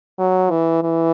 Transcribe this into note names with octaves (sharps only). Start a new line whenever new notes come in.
F#3
E3
E3